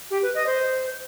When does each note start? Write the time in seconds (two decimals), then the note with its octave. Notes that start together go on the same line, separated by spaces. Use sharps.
0.11 G4
0.23 B4
0.35 D#5
0.46 C5